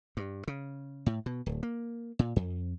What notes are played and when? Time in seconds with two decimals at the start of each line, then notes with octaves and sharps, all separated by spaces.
0.17 G2
0.48 C#3
1.06 A2
1.26 B2
1.46 D1
1.63 A#3
2.19 A#2
2.36 F2